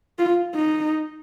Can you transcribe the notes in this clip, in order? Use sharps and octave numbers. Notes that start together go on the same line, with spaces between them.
F4
D#4